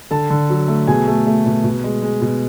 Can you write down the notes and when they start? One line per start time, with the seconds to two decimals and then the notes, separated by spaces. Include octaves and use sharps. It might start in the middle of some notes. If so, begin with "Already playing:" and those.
0.11 D3 A4 A5
0.30 D3
0.50 F#3
0.68 A3
0.88 B2 G#4 G#5
1.08 A3
1.27 A3
1.46 B2
1.64 B2
1.84 G#3
2.02 G#3
2.22 B2